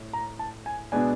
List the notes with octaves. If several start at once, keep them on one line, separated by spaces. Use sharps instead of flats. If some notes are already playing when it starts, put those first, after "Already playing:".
Already playing: A2
A#5
A5
G#5
B2 G#3 B3 D4 G#5